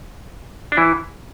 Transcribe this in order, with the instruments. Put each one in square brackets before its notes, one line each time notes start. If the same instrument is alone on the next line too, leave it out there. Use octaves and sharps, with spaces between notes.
[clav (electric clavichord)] D4
E3 E4